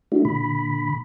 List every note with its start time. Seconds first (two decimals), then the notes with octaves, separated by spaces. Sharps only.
0.12 A3 D4 E4 F#4
0.25 A#2 D3 B5